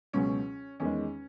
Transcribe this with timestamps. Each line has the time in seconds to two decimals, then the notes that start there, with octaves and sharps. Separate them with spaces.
0.13 C#2 B2 F#3 C#4
0.80 E2 D#3 G#3 C#4